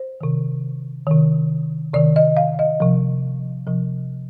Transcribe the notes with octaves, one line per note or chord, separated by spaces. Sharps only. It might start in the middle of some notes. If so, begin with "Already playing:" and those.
Already playing: C5
C3 D#3
C3 D#3
C3 D#3 D5
D#5
F5
D#5
C3 F3
C3 F3